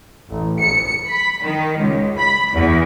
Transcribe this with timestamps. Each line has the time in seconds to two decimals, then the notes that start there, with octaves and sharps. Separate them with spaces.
0.30 A1
0.61 C#7
1.08 B5
1.43 D#3
1.78 C#2
2.17 B5
2.54 E2